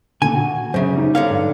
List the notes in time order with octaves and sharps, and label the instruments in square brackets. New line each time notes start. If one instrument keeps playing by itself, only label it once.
[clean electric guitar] A#2 D3 [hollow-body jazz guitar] G#5
[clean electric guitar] F#4
[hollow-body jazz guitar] F#2 C#3 [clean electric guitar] C5 E5
[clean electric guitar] G3 D#4
[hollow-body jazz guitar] D3 C#5 F5
[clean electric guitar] G2